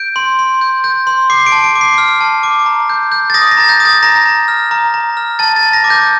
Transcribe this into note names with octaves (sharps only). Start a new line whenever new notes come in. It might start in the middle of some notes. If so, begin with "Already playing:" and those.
Already playing: G6 D7
C6
C6
G6
G6
C6
D6 C7
D7
A5
D7
D6
C7
F6
A5
D6
A#5
G6
G6
A6
D#6 A#6
A#6
A#5 A6
G6
D#6
A6
A#5 A#6
A#5
F6
A#5
A#5
F6
A5 A6
A6
A5
A#6
D6
G6